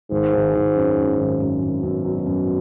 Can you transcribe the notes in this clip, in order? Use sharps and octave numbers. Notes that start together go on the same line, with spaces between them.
G#1 G#2
G#1
G#1
F#2
F#2
G#1
F#2
G#1
F#2 B2
F#3
F#2